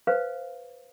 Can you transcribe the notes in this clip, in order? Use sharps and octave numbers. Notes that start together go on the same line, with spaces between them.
B4 C5 F5